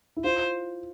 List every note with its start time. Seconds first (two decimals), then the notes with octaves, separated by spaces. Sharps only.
0.17 E4
0.24 F4 C5